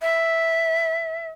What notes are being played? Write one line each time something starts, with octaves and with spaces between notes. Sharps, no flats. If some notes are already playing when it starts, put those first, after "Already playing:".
E5